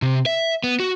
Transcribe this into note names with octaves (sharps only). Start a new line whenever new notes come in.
C3
E5
B3
F#4